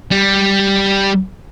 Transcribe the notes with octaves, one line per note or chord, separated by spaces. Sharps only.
G3